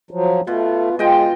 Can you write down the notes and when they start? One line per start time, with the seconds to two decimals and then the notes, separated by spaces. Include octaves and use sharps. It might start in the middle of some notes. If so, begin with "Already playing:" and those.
0.11 F3 F#3
0.47 B2 A3 F4
0.99 G#3 F4 D#5 G5